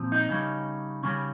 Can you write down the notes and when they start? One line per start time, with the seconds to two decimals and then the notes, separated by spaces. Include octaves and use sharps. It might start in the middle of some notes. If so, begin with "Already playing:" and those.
Already playing: A#2 F3 C4
0.12 D#4
0.29 C#3 G3 C#4
1.03 C#3 G3 C#4